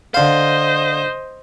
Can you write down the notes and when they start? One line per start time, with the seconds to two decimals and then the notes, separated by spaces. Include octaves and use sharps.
0.14 D3 C5 D#5 F5